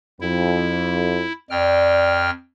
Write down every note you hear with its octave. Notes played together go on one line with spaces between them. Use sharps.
F2 E4
F2 D5 G5 F6